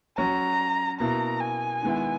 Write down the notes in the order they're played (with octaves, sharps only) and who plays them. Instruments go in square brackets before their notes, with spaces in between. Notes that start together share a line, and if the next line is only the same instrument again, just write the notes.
[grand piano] F#3 C#4 F#4 [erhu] A#5
[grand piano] B2 A#3 E4 [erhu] A#5
[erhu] G#5
[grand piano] D#3 G#3 B3 E4